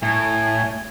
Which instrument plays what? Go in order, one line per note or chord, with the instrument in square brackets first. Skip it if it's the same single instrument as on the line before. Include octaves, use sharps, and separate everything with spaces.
[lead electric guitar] A2 [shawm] G#5